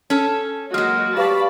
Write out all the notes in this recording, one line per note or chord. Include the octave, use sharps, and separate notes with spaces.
C#4 A4
F#3 G#3 A#3 F#4 D#5 F6
G4 B4 D5 F5 A5 B5 C#6